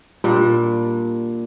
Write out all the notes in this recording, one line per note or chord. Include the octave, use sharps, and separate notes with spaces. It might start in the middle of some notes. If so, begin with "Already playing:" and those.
A#2 G3 D4